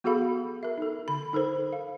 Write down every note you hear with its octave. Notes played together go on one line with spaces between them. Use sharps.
B3 F#4 G#4 A4 F5 B5
A#4 E5
D#4 A4
D3 B5
D#4 A4 A#4 C5
F5